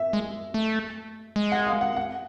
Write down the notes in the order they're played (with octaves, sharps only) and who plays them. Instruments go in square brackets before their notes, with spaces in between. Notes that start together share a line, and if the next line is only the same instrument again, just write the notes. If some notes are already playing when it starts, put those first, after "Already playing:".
Already playing: [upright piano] E5
[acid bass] G#3
A3
G#3
[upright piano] F#5
F5
F#5
F#5